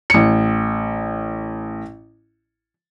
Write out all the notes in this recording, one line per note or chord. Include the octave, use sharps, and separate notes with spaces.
A1 C#7